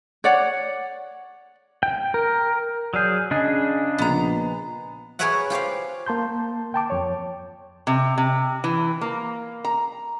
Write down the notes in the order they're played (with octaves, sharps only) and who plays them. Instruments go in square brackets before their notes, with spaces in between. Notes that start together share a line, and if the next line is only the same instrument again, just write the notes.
[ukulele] C#5 D5 F#5
[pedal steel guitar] G5
A#4
[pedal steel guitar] F#3 G#4 [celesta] D5 F6 G6
[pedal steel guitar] C#3 D4 G#4 [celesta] D#5 G#5
[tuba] A#1 [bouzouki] B3 A#5
[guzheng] G#4 A#4 B4 C#5 E5 F#5
F4 G4 C5 F5
[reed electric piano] A#3 A5 C6 G6
G5 A5 D6
F2 C#5
[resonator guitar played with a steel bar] C3
C3
E3
A#3
A#5